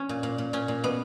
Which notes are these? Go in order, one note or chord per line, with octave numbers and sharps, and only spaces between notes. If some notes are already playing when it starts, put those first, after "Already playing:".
Already playing: C#4
A#2
A#2
A#2
A#2 C#4
A#2
B2 B3